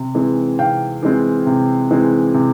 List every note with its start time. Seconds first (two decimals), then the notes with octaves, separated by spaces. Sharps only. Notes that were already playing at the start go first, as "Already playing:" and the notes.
Already playing: C3
0.15 E3 G#3 C4
0.59 C3 F5 G5
1.03 E3 G#3 C4
1.46 C3
1.91 E3 G#3 C4
2.34 C3